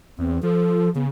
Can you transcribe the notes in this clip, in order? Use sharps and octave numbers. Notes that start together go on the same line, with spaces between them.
E2 C4
F3 A4
C#3 B3